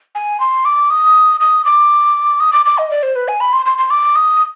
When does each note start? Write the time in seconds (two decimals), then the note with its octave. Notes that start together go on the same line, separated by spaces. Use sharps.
0.15 G#5
0.40 C6
0.65 D6
0.90 D#6
1.41 D#6
1.65 D6
2.40 D#6
2.53 D6
2.66 D6
2.78 D#5
2.91 D5
3.03 C5
3.16 B4
3.28 G#5
3.40 B5
3.53 C6
3.66 C6
3.78 C6
3.90 D6
4.16 D#6